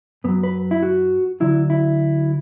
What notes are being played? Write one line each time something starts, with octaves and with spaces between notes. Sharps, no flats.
F#2 F#3 B3
B4
E4
F#4
D2 D3 F#3 E4
E4